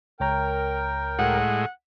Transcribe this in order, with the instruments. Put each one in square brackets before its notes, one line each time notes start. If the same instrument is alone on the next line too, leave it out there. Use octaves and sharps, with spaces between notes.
[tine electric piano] C#2 C#5 A#5 [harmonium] A#4 G5
[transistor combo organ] A2 G#3 [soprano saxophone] F#5